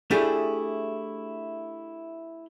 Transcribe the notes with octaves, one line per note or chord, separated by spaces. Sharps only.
A3 D4 E4 G4 G#4